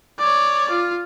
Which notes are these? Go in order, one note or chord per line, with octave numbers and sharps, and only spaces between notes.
C#5 D5
F4